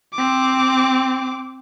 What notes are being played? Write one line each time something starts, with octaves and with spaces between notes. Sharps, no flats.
C4 D6